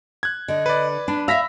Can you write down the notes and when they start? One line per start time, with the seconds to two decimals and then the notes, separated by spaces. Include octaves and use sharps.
0.23 F#6 G#6
0.48 D3 D#5
0.66 B4 D5
1.08 D4 B5
1.28 E5 F5 B5 E6 A#6 B6